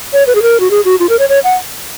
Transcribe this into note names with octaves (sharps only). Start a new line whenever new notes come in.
C#5
B4
G#4
A#4
F#4
G#4
F#4
F4
A#4
C#5
C#5
F#5